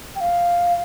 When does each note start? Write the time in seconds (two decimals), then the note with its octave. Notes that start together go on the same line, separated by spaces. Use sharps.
0.16 G5
0.20 F5